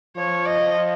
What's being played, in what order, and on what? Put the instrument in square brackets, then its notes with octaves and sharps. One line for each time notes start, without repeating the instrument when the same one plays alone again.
[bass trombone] F3 [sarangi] C#5
[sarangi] D#5
[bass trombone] F3